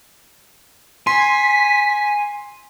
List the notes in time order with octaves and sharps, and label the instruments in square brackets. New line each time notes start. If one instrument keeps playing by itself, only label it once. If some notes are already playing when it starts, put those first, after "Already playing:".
[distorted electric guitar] G#5 [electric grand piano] C6 [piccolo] B6